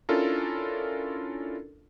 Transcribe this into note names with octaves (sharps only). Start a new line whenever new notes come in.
C#4 D4 E4 F4 A4 A#4